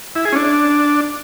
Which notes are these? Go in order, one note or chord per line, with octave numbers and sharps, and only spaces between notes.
E4
G#4
C#4
D4